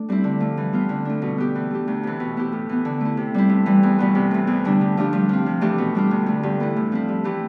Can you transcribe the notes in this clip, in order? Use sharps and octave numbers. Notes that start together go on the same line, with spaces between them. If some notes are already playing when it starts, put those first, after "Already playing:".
Already playing: A3 D4
G3 C4 E4
D3
F3 A3
E3
G3 B3 F4
D3
A3 D4
B2
B3 D4 G4
E3
A3 D4 G4
D2
C3 E3
B2
B3 E4 G4
A2
E3 B3
D3
A3 E4
C3
G3 C4 E4
G2
E3 G3
E2
B2 G3 B3
C3
E3 A3
E2
D3 G3 D4
G2
F3 A3 D4 G4
G2
F3 C4
C3
E3 A3 D4 G4
B2
G3 D4 F4
D2
D3 A3
G2
E3 A3 E4
A2
F3 C4 E4
G2
E3 A3 E4 G4